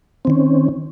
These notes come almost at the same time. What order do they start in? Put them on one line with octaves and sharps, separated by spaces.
C4 D#3 C#4